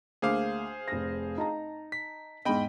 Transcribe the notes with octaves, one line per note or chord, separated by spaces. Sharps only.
D2 A#3 G#4 C5 F5 D6
F1 A#6
D#4 A5 A#5
B6
E2 G#2 D#5 G5 B5